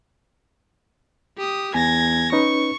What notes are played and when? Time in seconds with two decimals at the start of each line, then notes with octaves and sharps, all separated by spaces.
1.38 G4 D#6
1.74 E2 G#5 G#6 A#6
2.32 C#4 D#4 B4 C#6